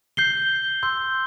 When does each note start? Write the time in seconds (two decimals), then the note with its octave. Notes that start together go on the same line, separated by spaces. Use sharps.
0.17 G6 C7 G7
0.83 C6 E6 G6